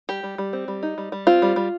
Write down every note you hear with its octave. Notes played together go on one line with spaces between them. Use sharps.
G3 G4
G3
G3
C4
G3
D#4
G3
G3
C4 F4
G3
G3